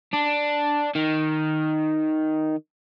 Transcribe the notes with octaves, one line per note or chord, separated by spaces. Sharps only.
D4
D#3